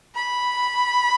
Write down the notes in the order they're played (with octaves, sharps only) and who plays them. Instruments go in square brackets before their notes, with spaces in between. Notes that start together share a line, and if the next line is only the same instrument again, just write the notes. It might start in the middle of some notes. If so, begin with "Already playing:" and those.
[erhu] B5